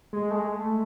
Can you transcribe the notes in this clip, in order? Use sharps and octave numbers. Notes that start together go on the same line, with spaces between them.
G#3
A3
G#3
A3